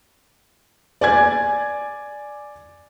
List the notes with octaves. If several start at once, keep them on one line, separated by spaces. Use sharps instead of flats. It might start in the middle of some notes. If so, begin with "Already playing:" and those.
D5 G#5 G#6